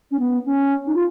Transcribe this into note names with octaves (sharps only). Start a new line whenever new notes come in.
C#4
B3
C#4
D#4
F4